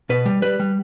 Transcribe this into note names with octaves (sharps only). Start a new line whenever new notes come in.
B2 B4
G3
G3 B4
G3